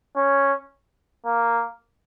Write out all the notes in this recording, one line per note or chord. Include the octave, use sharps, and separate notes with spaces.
C#4
A#3